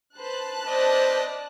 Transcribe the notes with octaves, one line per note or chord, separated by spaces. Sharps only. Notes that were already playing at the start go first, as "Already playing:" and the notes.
B4 C5 A5 F#6
C4 B4 C5 D5 D#5